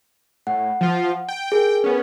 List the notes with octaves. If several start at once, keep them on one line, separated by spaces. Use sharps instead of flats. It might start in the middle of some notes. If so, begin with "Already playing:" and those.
A2 F#5
F3 F4
G5
G#4 A#4
B3 C#4